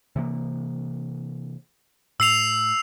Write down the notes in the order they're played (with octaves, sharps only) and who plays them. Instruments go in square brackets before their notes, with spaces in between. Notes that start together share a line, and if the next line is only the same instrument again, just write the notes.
[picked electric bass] C3 E3 A#3
[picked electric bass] A2 [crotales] E6 C7 F7